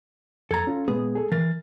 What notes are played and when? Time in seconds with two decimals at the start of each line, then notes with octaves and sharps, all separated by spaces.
0.51 F2 A4 A#5 G#6 A6
0.67 C#4 F4
0.88 A#2 G#3 B3 G#4
1.15 G#4 A4
1.32 E3 A#4 A6